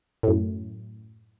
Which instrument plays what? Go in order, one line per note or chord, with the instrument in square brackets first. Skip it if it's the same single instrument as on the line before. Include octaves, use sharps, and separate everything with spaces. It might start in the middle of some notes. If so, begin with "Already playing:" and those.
[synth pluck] F#2 A2